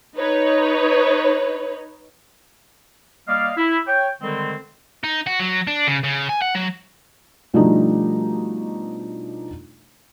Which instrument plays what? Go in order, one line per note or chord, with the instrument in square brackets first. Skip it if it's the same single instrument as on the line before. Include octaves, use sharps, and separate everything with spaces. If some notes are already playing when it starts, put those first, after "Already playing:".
[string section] D#4 B4 C#5
[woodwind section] G3 A#3 D5 D#5 F5
E4
C#5 G5
D3 D#3 G3 G#3 C4
[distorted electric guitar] D#4
F#4
F#3
D4
C#3
C#3
G#5
F#5
F#3
[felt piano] B2 F3 G3 A3 D4 D#4